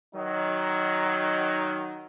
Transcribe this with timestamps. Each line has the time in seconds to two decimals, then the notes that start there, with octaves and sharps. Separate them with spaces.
0.15 D#3 F#3 D#4